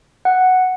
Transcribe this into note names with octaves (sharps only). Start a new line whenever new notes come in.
F#5